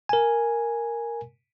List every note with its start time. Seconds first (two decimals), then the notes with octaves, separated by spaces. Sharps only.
0.09 A#4 G#5